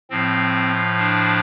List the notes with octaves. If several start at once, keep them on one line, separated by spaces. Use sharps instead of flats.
A2 F3 C4
D4